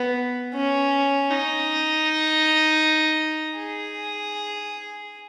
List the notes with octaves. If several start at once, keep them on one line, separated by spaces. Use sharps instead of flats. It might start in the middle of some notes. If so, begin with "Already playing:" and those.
Already playing: B3
C#4
D#4
G#4